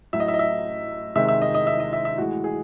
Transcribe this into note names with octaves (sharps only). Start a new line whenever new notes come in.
A2 F#3 E5
D#5
E5
D#5
E5
C3 D#3 G#3 E5
E5
D#5
D#5
E5
D#5
E5
E5
A2 E3 G#3 F#4
G#4